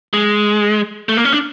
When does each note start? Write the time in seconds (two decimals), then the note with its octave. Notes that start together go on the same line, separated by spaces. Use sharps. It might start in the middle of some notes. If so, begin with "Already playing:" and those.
0.13 G#3
1.09 A3
1.17 A#3
1.25 C#4
1.33 D4